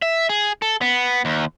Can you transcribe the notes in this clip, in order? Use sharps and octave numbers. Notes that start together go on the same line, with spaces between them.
E5
G#4
A4
B3
D#2